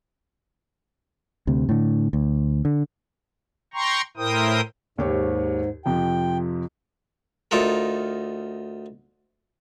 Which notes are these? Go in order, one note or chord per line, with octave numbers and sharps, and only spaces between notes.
D2 C3
A2 D3
D2
D3
G5 A#5 C6 C#6
A2 E4 A#4 C5 G5 D#6
D#2 G#2 G4 C#5
F2 C3 F3 G5
D2 D#4 F4 A4 A#4